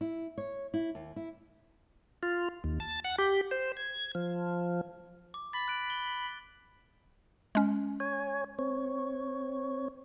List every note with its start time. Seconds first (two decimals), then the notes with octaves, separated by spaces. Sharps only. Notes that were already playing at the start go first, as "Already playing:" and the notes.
0.01 E4
0.38 C#5
0.74 E4
0.95 D#2
1.16 E4
2.23 F4
2.64 D#2
2.80 A5
3.04 F#5
3.18 G4
3.51 C5
3.77 G#6
4.15 F3
5.34 D6
5.53 B5 A6
5.68 F#6 D7
5.90 G7
7.55 G#3 C#4
8.00 C#5 G#5
8.59 C4 C#5